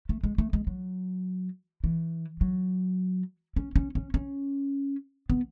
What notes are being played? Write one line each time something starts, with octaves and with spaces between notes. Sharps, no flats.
A3
G#3
A3
G#3
F#3
E3
F#3
C#4
C#4
C#4
C#4
B3